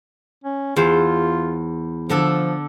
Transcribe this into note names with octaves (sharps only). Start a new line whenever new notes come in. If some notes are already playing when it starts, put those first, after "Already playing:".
C#4
E2 F4 C5
D3 F3 D4 A4